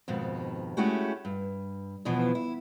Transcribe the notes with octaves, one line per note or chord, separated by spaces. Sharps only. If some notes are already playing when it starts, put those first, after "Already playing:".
F2 G#2 B2 D#3
G#3 A3 C#4 E4 F#4 G4
G2
E2 B2 E3 F3
E4